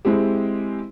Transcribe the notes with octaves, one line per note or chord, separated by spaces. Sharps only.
G#3 C4 E4 G4